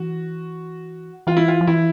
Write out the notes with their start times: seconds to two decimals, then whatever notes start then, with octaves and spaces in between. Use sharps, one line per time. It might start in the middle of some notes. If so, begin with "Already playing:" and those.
Already playing: E3 F#4
1.27 E3 F4
1.37 E4
1.48 F4
1.61 F3
1.67 E3 E4